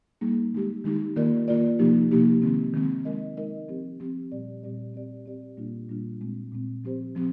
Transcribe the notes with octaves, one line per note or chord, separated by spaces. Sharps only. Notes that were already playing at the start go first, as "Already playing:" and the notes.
G3 A#3 D#4 G#4
D#3 G#3 D#4 G4
D#3 G#3 D#4 G4
D#3 A#3 F4 A#4 D5
D#3 A#3 F4 A#4 D5
C3 F3 A#3 D#4 G4
C3 F3 A#3 D#4 G4
D#3 G#3 C4
D#3 G#3 C4
G#3 D#4 A#4 D#5
G#3 D#4 A#4 D#5
F3 C4 G4
F3 C4 G4
A#2 G3 C4 G4 D5
A#2 G3 C4 G4 D5
C4 G4 D5
C4 G4 D5
A#2 G3 A#3 D4 F4
A#2 G3 A#3 D4 F4
A#2 G#3 C4
A#2 G#3 C4
F3 C4 G4 C5
F3 C4 G4